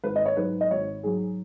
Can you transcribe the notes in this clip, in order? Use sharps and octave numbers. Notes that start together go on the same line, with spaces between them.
G#1 B4
D#5
C#5
G#2 F#3 B4
D#5
G#1 C#5
G#2 F#3 G#4